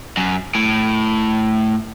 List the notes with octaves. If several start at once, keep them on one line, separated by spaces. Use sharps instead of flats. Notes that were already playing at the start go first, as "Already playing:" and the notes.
F#2
A2